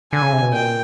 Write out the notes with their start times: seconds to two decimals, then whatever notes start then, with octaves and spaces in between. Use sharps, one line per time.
0.13 D3 G#5
0.22 C#3
0.33 C3
0.42 B2
0.52 A#2 G5